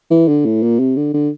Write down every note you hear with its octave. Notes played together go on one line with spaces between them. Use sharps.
E3
D3
A2
A#2
C3
D3
D3